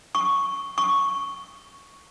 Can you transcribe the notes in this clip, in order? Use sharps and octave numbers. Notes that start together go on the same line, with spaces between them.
C#6
C#6